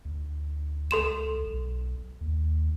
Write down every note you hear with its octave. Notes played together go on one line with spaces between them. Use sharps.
D2
C#2 A4 C6 E7
B1
D#2